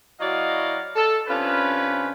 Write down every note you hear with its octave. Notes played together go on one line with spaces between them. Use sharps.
F#3 E4 F#4 D5 D#5 F5
A4
C3 C#4 D4 F4 B4